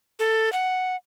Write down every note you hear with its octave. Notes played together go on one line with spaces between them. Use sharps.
A4
F#5